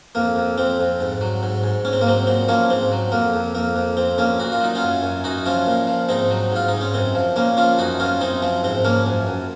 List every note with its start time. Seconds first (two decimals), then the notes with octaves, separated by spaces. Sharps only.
0.15 F2 A#3
0.36 F2
0.58 F2 C4
0.80 F2
1.00 G#2
1.21 F#3
1.43 G#2
1.64 G#2
1.85 G#2 C#4
1.93 C4
2.01 A#3
2.07 F#3 C4
2.27 A#2 C4
2.48 F3 A#3 C#4
2.70 G#2 C4
2.92 F#3
3.12 F2 A#3
3.34 F2
3.55 F2 A#3
3.76 F2
3.97 F2 C4
4.18 F2 A#3 C#4
4.39 A#2 F#4
4.52 F4
4.61 F#3 D#4
4.75 C#4 F4
4.83 F#2
5.03 F#2
5.24 F#2 D#4 F#4
5.46 F3 C#4 F4
5.67 A#2
5.87 F3
6.09 G#2 C4 D#4
6.30 F#3
6.52 G#2 F4
6.68 G#2 D#4
6.81 C#4
6.94 F#2 C4
7.15 F3
7.36 A#2 A#3 C#4
7.57 F3 C#4 F4
7.78 F#2 D#4 F#4
8.00 F#2 C#4 F4
8.21 F#2 C4 D#4
8.42 F3 C4
8.63 G#2 C4
8.85 F3 A#3 C#4
9.07 F#2
9.27 F#2